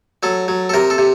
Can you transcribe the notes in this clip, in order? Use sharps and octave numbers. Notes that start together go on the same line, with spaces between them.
F#3 A4
F#3
A4
C3 A#4
A4
C3